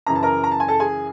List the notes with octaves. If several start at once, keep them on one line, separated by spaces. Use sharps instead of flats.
F#2 C#3 E3 A#5
A5
A#4 A#5
A#5
A5
G#5
A4 A5
G#4 G#5